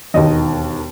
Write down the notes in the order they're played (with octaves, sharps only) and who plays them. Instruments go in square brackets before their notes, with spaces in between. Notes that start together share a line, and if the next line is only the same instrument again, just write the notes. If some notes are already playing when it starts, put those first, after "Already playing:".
[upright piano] E1 D#2 D#3 D#5